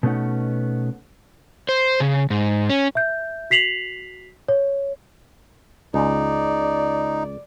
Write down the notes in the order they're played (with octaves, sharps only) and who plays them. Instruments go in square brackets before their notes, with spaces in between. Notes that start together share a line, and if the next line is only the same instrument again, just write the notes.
[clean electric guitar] B2 A3 B3 C#4 D#4 F#5
[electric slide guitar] C5
C#3
G#2
C#4
[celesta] E5 G6
F#4 B6 C7 F7 F#7
C#5
[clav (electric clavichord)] C#2 [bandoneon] D#4 [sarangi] D5